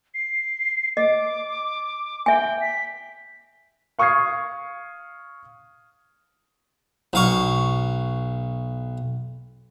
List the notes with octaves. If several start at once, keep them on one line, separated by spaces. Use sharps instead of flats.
C7
D#5 D6
E5 G5 G#5
B6
F5 C#6 D#6 F6 G#6 C7
B1 F5 C#6